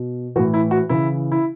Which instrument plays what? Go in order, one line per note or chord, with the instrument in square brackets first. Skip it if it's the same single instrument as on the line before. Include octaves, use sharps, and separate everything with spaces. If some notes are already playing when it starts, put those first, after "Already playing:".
Already playing: [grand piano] B2
E3 F#4
A2
E4
F#4
C#3 E3 E4
E4